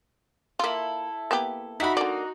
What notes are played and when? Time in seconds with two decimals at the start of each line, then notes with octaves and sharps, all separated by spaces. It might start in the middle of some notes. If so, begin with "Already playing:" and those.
0.59 A#3 E4 F4 A4
1.31 A#3 B3 G4
1.80 D#4 E4 F#4 B5
1.97 D3 A#3 D5